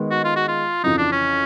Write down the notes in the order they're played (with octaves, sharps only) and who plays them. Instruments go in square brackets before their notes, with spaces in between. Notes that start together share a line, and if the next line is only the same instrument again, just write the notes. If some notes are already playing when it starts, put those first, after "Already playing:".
Already playing: [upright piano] D#3 G#3 B3
[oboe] F#4
F4
F#4
F4
[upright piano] F2 C#3 E3 [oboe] D#4
[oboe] D4
C#4